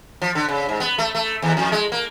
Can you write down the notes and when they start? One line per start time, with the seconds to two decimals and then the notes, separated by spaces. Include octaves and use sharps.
0.22 F3
0.35 D3
0.48 C#3
0.69 G#2
0.80 B3
0.98 A3
1.15 A3
1.42 D#2
1.57 F2
1.72 G#3
1.92 A#3